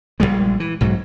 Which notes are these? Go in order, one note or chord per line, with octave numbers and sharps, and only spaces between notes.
A#1 G#2 G3 G#3
E3
B1 G#2 F#3